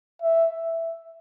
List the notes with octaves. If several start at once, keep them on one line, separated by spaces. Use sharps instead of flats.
E5